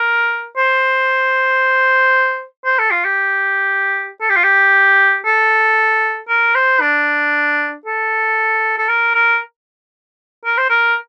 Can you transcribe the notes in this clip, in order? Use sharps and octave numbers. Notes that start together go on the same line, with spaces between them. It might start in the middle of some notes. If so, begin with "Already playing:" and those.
Already playing: A#4
C5
C5
A4
F4
G4
A4
G4
F4
G4
A4
A#4
C5
D4
A4
A4
A#4
A#4
A#4
C5
A#4